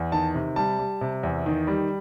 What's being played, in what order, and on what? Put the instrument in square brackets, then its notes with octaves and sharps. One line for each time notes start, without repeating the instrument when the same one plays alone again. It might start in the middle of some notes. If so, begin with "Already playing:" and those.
Already playing: [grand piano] E2
D#3 A5
C3
G3 A5
G3
C3
E2
D#3
G3